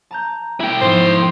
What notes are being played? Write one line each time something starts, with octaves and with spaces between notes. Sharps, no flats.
A5 A#5 G6
E4 G5
G#2 F3 C5